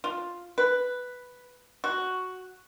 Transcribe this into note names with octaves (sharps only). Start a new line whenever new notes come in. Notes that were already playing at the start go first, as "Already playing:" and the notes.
F4
B4
F#4